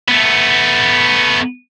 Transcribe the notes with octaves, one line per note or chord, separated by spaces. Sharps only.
A3 B3